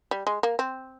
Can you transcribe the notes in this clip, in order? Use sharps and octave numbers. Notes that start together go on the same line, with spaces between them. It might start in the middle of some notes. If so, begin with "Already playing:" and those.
G3
G#3
A#3
C4